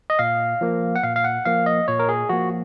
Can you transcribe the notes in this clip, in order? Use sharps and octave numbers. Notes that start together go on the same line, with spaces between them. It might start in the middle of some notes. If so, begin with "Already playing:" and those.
D#5
A#2 F5
F3 A#3
F#5
A#2 F5
F5
F#5
F3 A#3 F5
D#5
A#2 C#5
A#4
G#4
F3 A#3 F#4